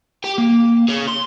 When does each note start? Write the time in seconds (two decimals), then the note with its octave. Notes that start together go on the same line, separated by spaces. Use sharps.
0.24 G4 G5
0.38 A#3
0.89 G#4 C#5
1.08 C6